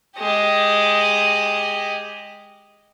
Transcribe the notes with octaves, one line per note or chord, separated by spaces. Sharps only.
G#3 G4